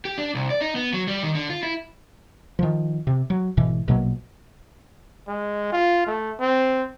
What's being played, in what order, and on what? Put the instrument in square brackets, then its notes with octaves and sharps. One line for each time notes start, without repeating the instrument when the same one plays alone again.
[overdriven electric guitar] G4
D4
C2
D5
D#4
B3
F#3
G3
D#3
D3
F4
E4
[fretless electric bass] D#3 F3
C3
F#3
G#1 G#2 B2 E3
A#1 B2 F#3 A#3
[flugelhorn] G#3
F4
A3
C4